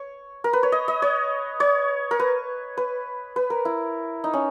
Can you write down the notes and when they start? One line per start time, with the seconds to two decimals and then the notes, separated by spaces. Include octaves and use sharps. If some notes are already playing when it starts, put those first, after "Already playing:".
Already playing: C#5
0.44 A#4
0.53 B4
0.63 C#5
0.72 D#5
0.88 D#5
1.02 C#5
1.60 C#5
2.11 A#4
2.20 B4
2.77 B4
3.36 B4
3.50 A#4
3.65 E4
4.24 D#4
4.33 C#4